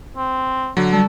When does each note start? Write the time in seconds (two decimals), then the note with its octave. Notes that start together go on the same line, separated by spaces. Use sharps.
0.17 C4
0.77 D3 F#3
0.93 G3 A4